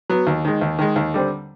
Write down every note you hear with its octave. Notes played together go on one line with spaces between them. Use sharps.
F#3 B3
D#2
D#3 G#3
D#2
D#3 G#3
D#2
D3 G3 C4